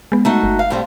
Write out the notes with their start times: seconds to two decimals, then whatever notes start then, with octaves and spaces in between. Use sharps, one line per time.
0.12 G#3 B3
0.25 A3 D#4 F#4
0.43 G1
0.59 F5
0.70 A2 G3 C4